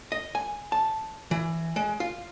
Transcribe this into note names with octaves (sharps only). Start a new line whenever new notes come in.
D#5
G#5
A5
E3
G#3
F4